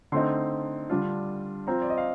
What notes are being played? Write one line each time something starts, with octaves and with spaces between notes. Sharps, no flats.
D3 A3 C4 D#4 C6
D3 G3 D4 F4
F3 C4 F4 A#5
D5
D#5
F5